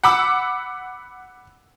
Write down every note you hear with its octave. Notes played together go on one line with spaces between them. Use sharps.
F#5 B5 D6 E6